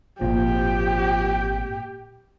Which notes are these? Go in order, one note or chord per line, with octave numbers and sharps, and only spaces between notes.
G#1 A#2 F3 G4